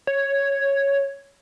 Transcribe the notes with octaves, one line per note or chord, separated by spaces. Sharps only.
C#5